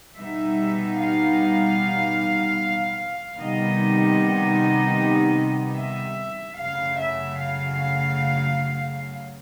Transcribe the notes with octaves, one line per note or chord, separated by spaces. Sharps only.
B2 G3 B3 D#4 E5
F5
C3 D#3 G3 B3 D#4 D#5
E5
F#2 C#3 F#3 A3 F5
E5
F5